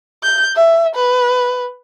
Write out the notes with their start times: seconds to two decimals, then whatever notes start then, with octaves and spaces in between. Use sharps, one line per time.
0.23 G6
0.56 E5
0.96 B4